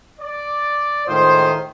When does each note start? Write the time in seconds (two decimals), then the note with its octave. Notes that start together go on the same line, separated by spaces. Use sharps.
0.20 D5
1.08 A2 D#3 G#3 F4 C5 D#6